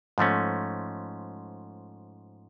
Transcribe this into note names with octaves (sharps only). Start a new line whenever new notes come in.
G#2 F3 A3 C#4